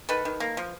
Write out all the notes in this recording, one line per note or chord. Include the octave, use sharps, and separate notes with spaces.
D#3 A4 B4
D#3
A#3
F3